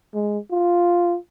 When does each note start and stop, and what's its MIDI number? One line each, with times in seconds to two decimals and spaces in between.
0.14 0.38 56
0.51 1.16 65